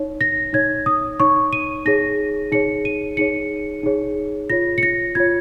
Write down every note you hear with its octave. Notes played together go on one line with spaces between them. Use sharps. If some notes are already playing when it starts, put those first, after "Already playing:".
Already playing: D#4 C#5
A#6
D#4 C#5 G#6
D#6
D#4 C#5 C#6
D#7
D#4 G#4 C#5 A#6
D#4 G#4 C#5 C#7
D#7
D#4 G#4 C#5 C#7
D#4 G#4 C#5
F4 C#5 A#6
C#7
A#6
F4 C#5 G#6